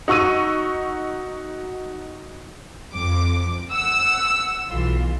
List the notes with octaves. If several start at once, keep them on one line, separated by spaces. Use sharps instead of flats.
D#4 F#4 C#6 E6 D#7
F2 D6
F#5 E6
B1 E3 F4